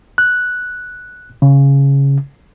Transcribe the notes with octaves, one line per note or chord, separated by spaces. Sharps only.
F#6
C#3